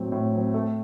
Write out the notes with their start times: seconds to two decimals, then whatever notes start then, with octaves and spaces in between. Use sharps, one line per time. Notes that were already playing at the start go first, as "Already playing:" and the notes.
Already playing: A2 F#3 C4
0.12 A2
0.33 F#3 C4
0.54 A3